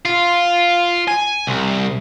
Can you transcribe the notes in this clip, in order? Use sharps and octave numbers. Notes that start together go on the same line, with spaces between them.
F4
G#5
C2